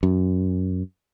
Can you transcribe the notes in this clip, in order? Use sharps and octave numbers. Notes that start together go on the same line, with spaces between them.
F#2